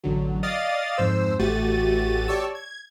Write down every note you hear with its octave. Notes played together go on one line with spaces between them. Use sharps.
A1 D3 F#3
D5 D#5 F5 D#6 A6
F2 G#2 C5 E6
A1 A3 F#4 G4 A6 D#7
G4 C#5 D5 A5 C#6 E6
G#6